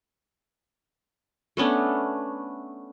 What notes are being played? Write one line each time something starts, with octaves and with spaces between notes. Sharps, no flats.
A3 B3 C#4 D4